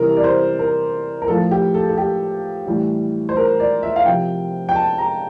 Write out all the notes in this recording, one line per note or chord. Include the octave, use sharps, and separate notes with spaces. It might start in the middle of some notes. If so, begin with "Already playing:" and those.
Already playing: C3 E3 G3 A#4
D5
C5
A#4
A#4
A2 F3 A4
G4
A4
A4
G4
A2 E3 G3
C5
A#4
D5
E5
F5
C3 F3 G5
G5
A5
A#5